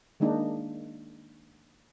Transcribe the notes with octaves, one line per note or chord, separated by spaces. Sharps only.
D#3 G#3 A#3 D4 D#4